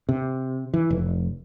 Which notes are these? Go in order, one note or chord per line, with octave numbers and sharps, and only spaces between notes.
C3
E3
F1